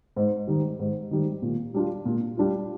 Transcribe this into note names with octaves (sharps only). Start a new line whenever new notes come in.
G#2
D#3 G3
G#2
D#3 G3
A#2
G3 D4 F4
A#2
G3 D4 F4